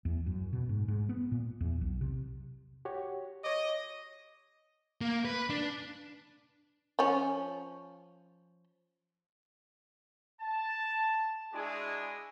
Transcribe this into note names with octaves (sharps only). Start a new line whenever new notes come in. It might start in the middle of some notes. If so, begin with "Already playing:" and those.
E2
F#2
B2
G#2
G#2
B3
A#2
E2
B1
C3
F#4 G4 C#5
C#5 D#5 D6
A#3
B4
D4
F3 C#4
A5
G#3 D4 E4 F#4 G#4 G#5